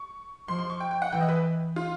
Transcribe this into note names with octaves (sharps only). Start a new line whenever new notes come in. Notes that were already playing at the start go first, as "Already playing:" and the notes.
Already playing: C#6
F3 C6
C6
C#6
G5
G5
F#5
E3 G5
D#5
B4
F4